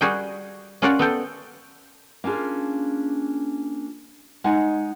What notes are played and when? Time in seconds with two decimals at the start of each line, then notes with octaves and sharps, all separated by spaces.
0.01 G3 F#4 G#4 A#4 G5
0.82 C#4 F4 A#4 D5 F#5
0.99 B3 A4 G5
2.24 A#3 C#4 D4 F4 G#4
4.44 G#3 D#4 F#5 G#5